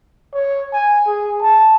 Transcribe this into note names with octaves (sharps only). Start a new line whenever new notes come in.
C#5
G#5
G#4
A5